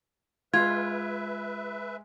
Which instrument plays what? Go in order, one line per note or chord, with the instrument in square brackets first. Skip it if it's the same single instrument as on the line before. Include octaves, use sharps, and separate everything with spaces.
[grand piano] G#3 [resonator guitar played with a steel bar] F4 [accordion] B4 E5 [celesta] G#6